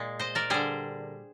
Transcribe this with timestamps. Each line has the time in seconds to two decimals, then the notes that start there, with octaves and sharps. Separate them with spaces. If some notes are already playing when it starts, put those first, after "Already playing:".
Already playing: A#2 G#3
0.19 C5 D#5
0.35 A#4 D5
0.50 D3 G3 G#4 C5